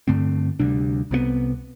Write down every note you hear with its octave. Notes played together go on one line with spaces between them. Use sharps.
G2 D3 A3 C4
D2 C3 G3 D4
C2 C3 E3 B3